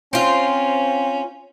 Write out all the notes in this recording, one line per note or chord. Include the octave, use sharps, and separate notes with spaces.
C4 C#4 F4